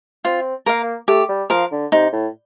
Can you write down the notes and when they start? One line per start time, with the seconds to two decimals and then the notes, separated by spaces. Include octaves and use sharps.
0.25 C4 F4
0.66 A#3 A#4 F5
1.08 A3 G4
1.29 G3
1.50 F3 A#4 F5
1.72 D3
1.92 C3 D#4
2.12 A2